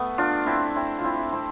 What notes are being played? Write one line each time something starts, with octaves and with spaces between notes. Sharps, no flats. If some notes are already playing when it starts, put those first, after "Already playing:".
Already playing: A3 B3
D4 F4
C4 E4
C4 E4
F4
C4 E4
C4 E4